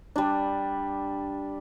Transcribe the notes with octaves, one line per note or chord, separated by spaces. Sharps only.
G3 D4